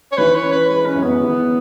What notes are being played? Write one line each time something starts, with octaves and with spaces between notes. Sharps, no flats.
C#5
E3 B4
C#5
C#4
B4
G#3 B4
C#4
F#2
B3
E3